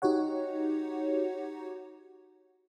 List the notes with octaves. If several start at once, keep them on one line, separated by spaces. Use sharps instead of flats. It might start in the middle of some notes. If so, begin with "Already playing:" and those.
D#4 F#4 G4 C#5 F#5